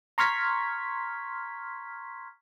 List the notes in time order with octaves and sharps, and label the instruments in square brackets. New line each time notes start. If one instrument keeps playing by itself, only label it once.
[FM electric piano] A#5 C6 C#6 F6 G#6 B6